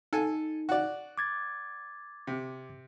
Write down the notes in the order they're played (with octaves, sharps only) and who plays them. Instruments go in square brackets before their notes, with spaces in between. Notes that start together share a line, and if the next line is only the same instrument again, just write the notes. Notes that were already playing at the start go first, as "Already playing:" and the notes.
[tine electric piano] D#4 [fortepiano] A4 G#5
[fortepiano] F#4 D5
[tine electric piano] D6 G#6 A6
[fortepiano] C3